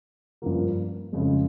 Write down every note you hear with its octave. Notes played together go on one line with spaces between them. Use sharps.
G2 F3 A#3
F2 C#3 G#3